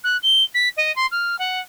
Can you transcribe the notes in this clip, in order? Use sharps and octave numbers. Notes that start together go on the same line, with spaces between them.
F#6
G7
B6
D#5
C6
F6
F#5